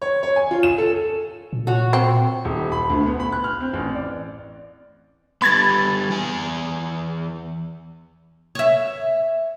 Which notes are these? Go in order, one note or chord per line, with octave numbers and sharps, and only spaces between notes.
C#5
C#5
G#5
F4
E7
A4
A#2
F#4 C#5
C4
D#1
B5
D2
B3
B5
F#6
F6
C4
A1
D5
G3 B3 B5 G#6 A6
E3 B3 G#5
C#5 E5